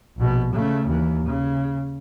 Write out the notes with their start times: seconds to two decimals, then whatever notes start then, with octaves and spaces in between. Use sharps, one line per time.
0.17 A#1 B2
0.53 C#3 A3
0.86 D#2 E3
1.26 C#3